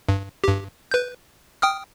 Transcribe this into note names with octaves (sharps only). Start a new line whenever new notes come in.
G2
G2 G4
B4 G6
G5 D#6 F6